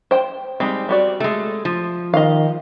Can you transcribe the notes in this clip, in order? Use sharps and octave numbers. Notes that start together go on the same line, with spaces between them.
C5 G5
G3 G#3 C4 D#4
G3 F#4 D5
G#3 A3
F3
D#3 D#5 F5